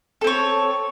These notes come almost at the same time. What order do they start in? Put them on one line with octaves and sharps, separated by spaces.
A4 C4 C#5